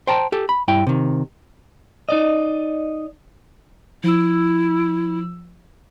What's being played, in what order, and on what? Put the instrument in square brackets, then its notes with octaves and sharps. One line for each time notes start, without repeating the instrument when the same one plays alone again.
[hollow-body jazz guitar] C5 G5 A5 A#5
G4 A4
B5
G2 E4 G5
C3 D#3
[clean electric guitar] D#4 D5 D#5
[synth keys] F3 E6 [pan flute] E4